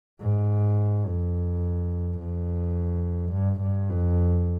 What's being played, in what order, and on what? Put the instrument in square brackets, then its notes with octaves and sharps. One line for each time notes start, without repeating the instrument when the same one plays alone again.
[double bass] G#2
F2
F2
G2
G2
F2